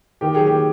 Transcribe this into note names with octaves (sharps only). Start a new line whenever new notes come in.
D#3 G4
F#3 G#4
D#3 G4